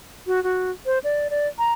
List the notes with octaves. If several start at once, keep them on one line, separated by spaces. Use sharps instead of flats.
F#4
F#4
C5
D5
D5
A#5